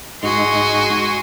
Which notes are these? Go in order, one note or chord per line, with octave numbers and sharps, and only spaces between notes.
G#2 G#3 D#4 F#4 G#5 C6